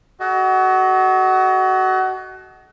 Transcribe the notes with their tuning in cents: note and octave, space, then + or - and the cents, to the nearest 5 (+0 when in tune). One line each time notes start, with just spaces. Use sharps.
F#4 +25 A4 -45 D#5 +0